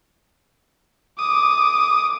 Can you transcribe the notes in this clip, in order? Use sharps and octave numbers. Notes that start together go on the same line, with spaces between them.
D6 D#6